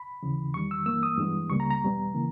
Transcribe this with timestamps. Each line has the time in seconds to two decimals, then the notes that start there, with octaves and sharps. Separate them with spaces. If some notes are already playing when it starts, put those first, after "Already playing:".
Already playing: B5
0.23 D#2 C#3 E3
0.54 E2 D#3 G3 C#6
0.71 E6
0.86 G2 E3 A#3 E6
1.03 D#6
1.18 G2 E3 G#3 B3
1.50 C#2 C#3 G3 A#3 C#6
1.60 A#5
1.70 A#5
1.82 E2 B2 G3 B3
2.14 C#3 E3 A#3